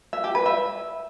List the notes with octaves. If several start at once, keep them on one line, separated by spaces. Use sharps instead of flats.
E5
G4
B4
E5